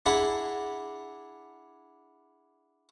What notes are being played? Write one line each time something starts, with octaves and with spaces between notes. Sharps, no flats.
D4 E4 G#4 F#5 A#5 B5